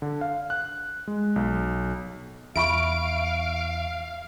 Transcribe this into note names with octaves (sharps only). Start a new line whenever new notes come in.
D3
F5
F#6
G#3
B1
E2 E5 F5 B5 C#6 D7